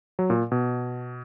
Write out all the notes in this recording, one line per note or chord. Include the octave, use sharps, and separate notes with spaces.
F#3
A#2
B2